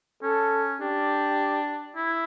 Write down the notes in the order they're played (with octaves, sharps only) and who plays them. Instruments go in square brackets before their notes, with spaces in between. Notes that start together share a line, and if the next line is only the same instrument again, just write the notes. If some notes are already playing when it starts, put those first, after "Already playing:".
[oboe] C#4 [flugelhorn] A4
[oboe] D4 [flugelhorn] G4
[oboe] E4